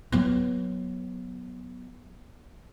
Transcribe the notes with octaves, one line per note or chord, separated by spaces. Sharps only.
F#3 B3